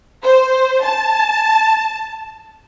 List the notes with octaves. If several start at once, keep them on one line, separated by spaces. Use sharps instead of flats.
C5
A5